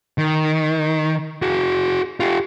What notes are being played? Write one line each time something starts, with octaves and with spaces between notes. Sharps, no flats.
D#3
F#4 G#4
F4 G4